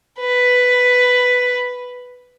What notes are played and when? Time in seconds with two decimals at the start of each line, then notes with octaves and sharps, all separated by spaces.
0.20 B4